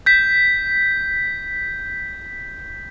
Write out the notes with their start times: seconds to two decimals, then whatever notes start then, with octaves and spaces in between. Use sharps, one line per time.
0.06 G6 B6